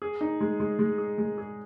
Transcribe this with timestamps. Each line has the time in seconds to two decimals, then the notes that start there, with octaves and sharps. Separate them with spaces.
0.02 G#4
0.21 D#4
0.41 G#3
0.60 G#3
0.79 G#3
0.98 G#4
1.18 G#3
1.38 G#4